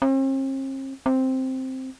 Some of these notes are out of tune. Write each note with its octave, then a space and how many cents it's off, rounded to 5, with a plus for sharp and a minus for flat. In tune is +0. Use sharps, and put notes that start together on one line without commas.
C4 +45
C4 +0